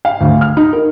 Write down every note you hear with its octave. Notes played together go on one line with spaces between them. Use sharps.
F5
D2
F6
D#4
A#4